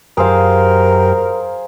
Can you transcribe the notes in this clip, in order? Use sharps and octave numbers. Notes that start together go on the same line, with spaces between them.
F#2 G4 G#4 A#4 C5 F5